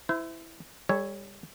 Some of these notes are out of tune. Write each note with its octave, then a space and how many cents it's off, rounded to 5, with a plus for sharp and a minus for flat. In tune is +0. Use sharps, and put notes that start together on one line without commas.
E4 +0 C5 -40
G3 +30 A4 +0 C#5 +0